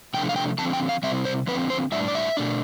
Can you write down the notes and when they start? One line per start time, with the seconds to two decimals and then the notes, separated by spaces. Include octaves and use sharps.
0.14 C3 F3 A3 D4 G5
0.29 F5
0.36 G5
0.58 D3 F3 C4 A5
0.73 G5
0.89 F5
1.03 C3 G3 C4 E5
1.25 C5
1.47 D3 F3 C4 B4
1.70 C5
1.92 A2 G3 D4 E5
2.08 D5
2.15 E5
2.37 B2 A3 D4